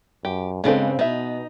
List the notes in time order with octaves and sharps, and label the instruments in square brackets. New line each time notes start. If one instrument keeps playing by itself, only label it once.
[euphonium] F#2 [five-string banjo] G4
[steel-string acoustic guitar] G2 C#3 C4 [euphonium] G#3 [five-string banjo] B3 D4 A4
[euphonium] B2 [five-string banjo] B3 E5 [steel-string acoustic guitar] D#4